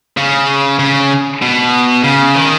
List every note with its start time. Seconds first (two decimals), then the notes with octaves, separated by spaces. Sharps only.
0.17 C#3
0.79 C#3
1.42 B2
2.04 C#3
2.35 D#3